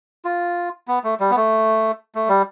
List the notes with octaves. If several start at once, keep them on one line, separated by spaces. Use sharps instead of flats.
F4
B3
A3
G3
B3
A3
A3
G3